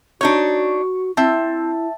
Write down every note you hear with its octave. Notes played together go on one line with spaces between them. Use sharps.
D4 D#4 F#4 C#5 C#6
C4 E4 E5 A5